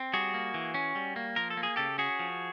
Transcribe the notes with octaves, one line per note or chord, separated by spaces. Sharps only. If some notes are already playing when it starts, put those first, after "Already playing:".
Already playing: C4
G3 F#4 G#4
A#3
E3
C#4
G3
A#3
F3 A#4
A4
A#3
G#4
C#3 G4 A4
C#4 F#4 G#4
F3